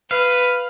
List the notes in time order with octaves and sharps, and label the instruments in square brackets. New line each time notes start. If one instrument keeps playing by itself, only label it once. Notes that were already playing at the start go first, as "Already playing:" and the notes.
[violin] B4 [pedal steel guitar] F5